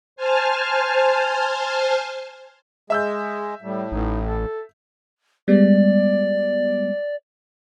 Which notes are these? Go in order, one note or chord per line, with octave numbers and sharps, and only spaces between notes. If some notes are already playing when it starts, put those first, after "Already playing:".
C5 G#5 A5 F6
G#3 G#4 E5 E6 G6
A2 G3
A1 D#4
A4
G3 G#3 B3 D5